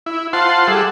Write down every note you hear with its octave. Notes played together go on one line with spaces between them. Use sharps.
E4
F4 C5 F#5 A5 C6
G3 G#4 A4 E5 F#5